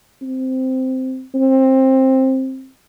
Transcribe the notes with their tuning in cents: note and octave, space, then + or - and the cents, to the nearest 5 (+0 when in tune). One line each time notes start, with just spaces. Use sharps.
C4 -10
C4 +15